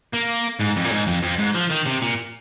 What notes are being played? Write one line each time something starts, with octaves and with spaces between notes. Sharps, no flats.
A#3
G#2
F2
A#2
G#2
F2
F2
G#2
F3
D#3
C3
A#2